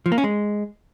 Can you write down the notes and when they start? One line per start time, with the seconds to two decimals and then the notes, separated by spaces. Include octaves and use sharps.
0.06 F3
0.12 A#3
0.18 C#4
0.24 G#3